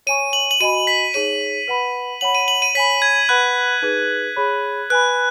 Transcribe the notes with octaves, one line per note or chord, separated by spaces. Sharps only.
C#5 G#5 C#6 D#7
F#7
F#7
F#4 D#5 G#5 B5 D#7
B6
D#4 G#4 C#5 D#7
B4 F#5 B5
C#5 F#5 B5 F#7
D#7
F#7
D#7
C#5 G#5 B5 B6
G#6
B4 F#5 B5 F#6
D#4 G#4 B4
G#4 C#5 B5
B4 G#5 B5 F#6